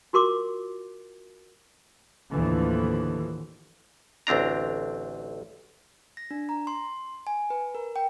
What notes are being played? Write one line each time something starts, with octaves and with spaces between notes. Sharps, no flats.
F4 F#4 A#4 C6 D6
D#2 A2 D3 E3 F3
A1 D2 C4 D4 A#5
A#6
D4
A#5
C6
G#5
B4
A#4
G5